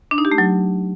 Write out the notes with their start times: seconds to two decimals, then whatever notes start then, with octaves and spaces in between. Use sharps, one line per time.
0.11 D4
0.18 D#4
0.25 G4
0.32 A3
0.38 F#3